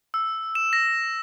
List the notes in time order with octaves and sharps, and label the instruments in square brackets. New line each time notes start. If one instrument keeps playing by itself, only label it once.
[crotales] E6
E7
A#6